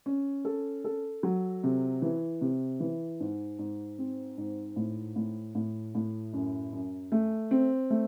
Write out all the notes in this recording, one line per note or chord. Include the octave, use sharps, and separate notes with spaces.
C#4
A4
A4
F#3
C3
E3
C3
E3
G#2
G#2
C4
G#2
A2
A2
A2
A2
F#2
F#2
A3
C4
A3